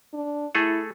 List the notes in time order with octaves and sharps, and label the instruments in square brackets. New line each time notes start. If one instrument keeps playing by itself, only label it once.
[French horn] D4
[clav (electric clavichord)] A3 G#4 A4 [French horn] E4